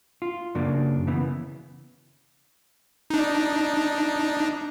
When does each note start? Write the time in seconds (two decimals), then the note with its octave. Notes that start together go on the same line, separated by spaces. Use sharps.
0.22 F4
0.55 F#2 C#3 A#3 D4
1.07 C#3 E3 B3
3.10 D4 D#4